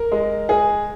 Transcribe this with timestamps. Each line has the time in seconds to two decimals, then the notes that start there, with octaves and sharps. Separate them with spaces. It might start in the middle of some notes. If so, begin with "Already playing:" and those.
Already playing: A#4
0.12 G#3
0.49 G#4